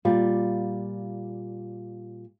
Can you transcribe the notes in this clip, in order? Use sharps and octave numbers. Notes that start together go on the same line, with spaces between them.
A#2 G3 F4 D5